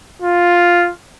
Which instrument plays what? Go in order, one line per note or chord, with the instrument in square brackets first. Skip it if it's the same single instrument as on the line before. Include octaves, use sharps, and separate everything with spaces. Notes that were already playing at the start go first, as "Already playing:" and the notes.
[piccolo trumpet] F4